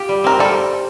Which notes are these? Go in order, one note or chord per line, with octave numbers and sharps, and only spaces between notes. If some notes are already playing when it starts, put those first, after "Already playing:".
Already playing: F4 G4
G3
C4 A#4
G3 A4